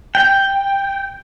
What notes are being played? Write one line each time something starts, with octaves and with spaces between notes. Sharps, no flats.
G5